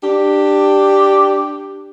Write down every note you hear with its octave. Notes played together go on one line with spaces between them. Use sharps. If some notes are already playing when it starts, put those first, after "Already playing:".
D4 G4